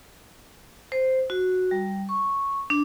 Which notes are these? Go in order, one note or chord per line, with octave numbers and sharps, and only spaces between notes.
C5
F#4
G3
C#6
D4